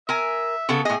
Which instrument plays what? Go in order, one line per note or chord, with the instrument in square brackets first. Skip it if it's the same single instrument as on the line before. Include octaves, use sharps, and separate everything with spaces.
[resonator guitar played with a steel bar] A#4 G#5 [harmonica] E5
[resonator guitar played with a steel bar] C#3 B3 A4
[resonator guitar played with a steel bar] A2 D#5 [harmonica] G#4